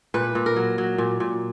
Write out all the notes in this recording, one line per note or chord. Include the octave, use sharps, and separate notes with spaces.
A#2 B4
A#2
A#4
F#3
F#3
A#2
A#2